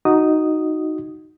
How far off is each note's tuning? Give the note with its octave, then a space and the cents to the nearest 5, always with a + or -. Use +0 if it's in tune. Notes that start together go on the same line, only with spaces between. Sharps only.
D#4 +0 F#4 +0 D#6 +0